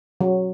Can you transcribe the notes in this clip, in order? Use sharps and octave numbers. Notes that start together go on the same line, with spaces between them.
F#3